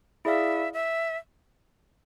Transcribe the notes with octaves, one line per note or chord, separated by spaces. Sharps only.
E4 G#4 D5 E5 F5
E5